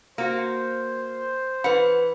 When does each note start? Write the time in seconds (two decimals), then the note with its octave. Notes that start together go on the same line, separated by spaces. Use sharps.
0.18 A#3 F#4 C5
1.64 E3 B4 F#5 B5